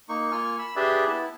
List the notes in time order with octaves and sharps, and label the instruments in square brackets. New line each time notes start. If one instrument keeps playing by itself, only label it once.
[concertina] A#3 D#4 C#6
A#3 F4 G#5 C#6 F6
B5 E6
D4 G4 G#4 B4 D5 E5
B3 E4 A5